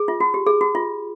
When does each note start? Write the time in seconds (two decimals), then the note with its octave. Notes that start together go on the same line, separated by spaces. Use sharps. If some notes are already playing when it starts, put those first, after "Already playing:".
Already playing: G#4
0.08 F4
0.20 F#4
0.34 G4
0.46 G#4
0.61 F#4
0.75 F4